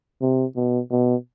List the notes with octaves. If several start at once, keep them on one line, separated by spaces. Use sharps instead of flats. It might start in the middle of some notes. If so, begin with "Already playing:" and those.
C3
B2
B2